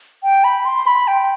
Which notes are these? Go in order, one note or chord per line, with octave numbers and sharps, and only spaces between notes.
G5
B5
C6
B5
G5